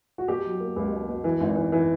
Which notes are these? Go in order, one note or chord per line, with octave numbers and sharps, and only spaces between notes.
F#4
B2 G4
F#3
A#3
C#2 G4
B2
B2
E3
G#1
E3
E3